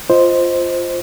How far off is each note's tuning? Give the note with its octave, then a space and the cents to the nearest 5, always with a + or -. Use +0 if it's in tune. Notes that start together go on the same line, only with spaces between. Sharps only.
F4 -5 C5 +0 D#5 +0